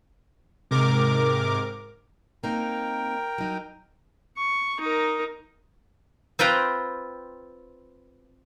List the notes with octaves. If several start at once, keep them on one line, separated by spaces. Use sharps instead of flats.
G#2 C3 A#4 D6
A#3 C4 D#4 A#4 G5
F#3 D#4
C#6
D#4 A#4
C4 F4 B4 G5 A#5